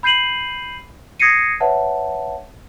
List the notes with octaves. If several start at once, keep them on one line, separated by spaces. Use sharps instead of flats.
B5 G6 C7 D#7 F#7
D#6 G#6 A#6 C7 C#7 D#7
B4 C#5 E5 F#5 A5